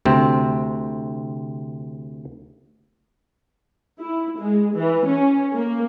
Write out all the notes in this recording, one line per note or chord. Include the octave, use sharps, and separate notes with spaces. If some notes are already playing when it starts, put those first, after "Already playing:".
D2 C3 C4
E4
G#3
E3
C#4
A#3